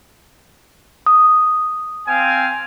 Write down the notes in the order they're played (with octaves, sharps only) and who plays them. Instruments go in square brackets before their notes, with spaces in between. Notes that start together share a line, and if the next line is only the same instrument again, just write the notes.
[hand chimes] D#6
[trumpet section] C4 F5 G#5